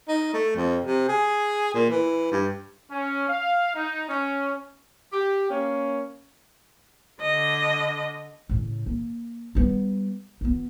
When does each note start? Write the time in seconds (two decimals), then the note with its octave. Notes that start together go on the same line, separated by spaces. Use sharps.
0.08 D#4
0.34 A3
0.56 F2
0.85 C3
1.09 G#4
1.74 A#2
1.90 E3
2.32 G2
2.92 C#4
3.29 F5
3.75 D#4
4.10 C#4
5.12 G4
5.49 A#3 C#4
7.21 D3 D#5
8.49 A2 C#3
8.86 A#3
9.55 G3 B3
10.41 B3 F4